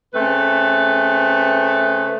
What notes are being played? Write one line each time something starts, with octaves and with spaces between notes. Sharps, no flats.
C#3 A3 C4 B4